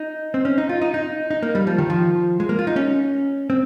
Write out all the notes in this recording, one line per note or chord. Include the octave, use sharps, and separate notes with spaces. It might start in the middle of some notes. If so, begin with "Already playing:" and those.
Already playing: D#4
C4
C#4
D#4
F4
D#4
D#4
D#4
A#3
G3
F3
D#3
F3
G#3
A#3
F4
D#4
C#4
C4